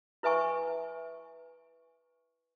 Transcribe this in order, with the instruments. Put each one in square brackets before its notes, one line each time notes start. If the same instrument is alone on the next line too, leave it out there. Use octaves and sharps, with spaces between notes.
[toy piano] E4 B4 E5 G#5 C#6